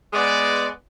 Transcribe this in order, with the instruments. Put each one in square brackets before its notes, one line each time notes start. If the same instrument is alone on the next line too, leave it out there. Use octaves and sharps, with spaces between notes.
[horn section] G#3 B3 D5